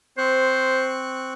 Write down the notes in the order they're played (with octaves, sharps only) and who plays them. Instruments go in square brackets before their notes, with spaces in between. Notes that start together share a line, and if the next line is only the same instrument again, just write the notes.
[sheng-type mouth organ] C4 C#6 F#6 [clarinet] C5